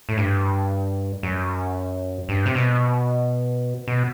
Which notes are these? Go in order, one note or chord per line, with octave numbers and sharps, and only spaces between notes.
A2
G2
F#2
G2
C3
B2
B2